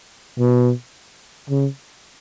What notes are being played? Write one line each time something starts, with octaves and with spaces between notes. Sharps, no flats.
B2
C#3